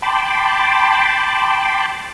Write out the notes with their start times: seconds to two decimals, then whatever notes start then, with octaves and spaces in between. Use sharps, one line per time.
0.02 G5 A5 B5 C6 D6